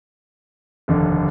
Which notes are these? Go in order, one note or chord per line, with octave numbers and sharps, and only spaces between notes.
F1 D#2 D3